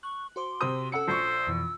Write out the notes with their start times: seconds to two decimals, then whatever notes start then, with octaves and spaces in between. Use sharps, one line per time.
0.03 C#6 F#6
0.36 F#4 C5 C6 D6
0.61 C3 C4 D#6
0.92 C#4 A4 F#5 E6 C#7
1.08 A#1 C5 C#6
1.47 F2 B2 E3